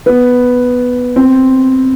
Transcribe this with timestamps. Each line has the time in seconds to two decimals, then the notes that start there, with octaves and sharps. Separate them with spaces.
0.06 B3
1.16 C4